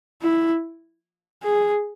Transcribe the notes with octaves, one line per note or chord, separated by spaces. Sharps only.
E4
G#4